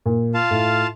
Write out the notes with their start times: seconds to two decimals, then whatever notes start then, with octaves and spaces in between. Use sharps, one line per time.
0.06 A#2
0.34 F4 F5 A5
0.51 A2